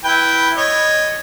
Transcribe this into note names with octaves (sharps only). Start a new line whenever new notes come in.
E4 B4 G5
C#5 D#5